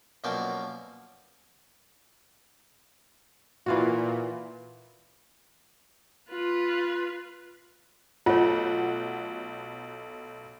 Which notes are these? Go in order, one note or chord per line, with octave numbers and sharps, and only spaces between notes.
F#2 B2 F3 A#3 D5 G5
A#2 E3 F4 F#4
F4 B4
B1 A3 F4 C#5 F#5